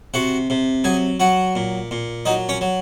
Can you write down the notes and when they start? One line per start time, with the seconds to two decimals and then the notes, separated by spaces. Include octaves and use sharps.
0.14 C3 F#4 F#5
0.50 C3
0.84 F#3 G#4 G#5
1.20 F#3 F#4 F#5
1.56 A#2
1.91 A#2
2.25 F#3 D#4 D#5
2.49 C#4 C#5
2.61 F#3